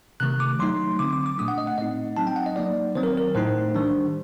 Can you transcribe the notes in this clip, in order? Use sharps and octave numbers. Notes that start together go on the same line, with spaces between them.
C3 D#3 A3 F#6
D6
F#3 A3 D#4 C6
D3 F#3 C4 D6
D6
D6
A#2 A3 D4 D#6
F#5
D#5
F#5
A2 A3 C4 D#4 D#5
F#3 C4 D#4 A5
G5
F#5
D#5
F#3 A#3 D#4 D5
D#3 F#3 C4 C5
A#4
A#4
A2 A3 D#4 C5
D#3 G3 D4